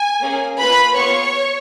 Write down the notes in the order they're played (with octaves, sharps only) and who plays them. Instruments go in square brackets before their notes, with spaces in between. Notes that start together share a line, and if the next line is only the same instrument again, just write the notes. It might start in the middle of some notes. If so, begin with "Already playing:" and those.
Already playing: [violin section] G#5
A#3 C#4 G#4
A#3 F4 G#4 B4 B5
B3 F4 G#4 C#5 C#6